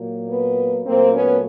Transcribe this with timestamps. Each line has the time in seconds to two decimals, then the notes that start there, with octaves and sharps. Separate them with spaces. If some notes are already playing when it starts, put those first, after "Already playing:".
Already playing: A#2 F#3 A#3
0.29 B3
0.85 A#2 F#3 A3 A#3 C4
1.13 B3 C#4